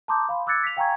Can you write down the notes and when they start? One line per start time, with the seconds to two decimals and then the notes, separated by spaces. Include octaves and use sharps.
0.08 A5 A#5 C6 D6 D#6 G6
0.29 F5 B5 C6
0.47 D6 E6 F#6 G#6 A6 C#7
0.63 B6 F7
0.77 F5 G5 G#5 A#5 C#6 G#6